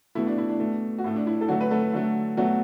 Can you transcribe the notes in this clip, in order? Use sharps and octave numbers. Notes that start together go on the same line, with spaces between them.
B2 A3 E4
D4
E4
D4
B2 A3
F#4
A2 A3 E4
D4
E4
A4
D3 F#3 A3 F#4
B4
A3 A4
D3 F#3 A3
B2 F#3 A3 F#4